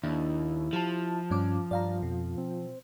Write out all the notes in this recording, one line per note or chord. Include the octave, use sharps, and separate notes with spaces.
D#2 D4 E4
F3 G4 A5
G2 C#4 D6
G2 D5 F5 A#5
F2 B2
C4